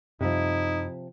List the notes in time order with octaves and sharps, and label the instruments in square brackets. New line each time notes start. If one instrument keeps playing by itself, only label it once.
[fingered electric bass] F#2 G3 [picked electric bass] C3 F3 [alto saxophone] D#4 [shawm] E4